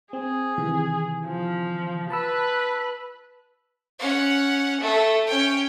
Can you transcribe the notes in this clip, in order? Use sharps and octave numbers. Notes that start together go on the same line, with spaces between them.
C4 G#4
C3 D#3 E3
F3
B4 A5 B5 E6
C#4 F#5
A3 A4
C#4 G5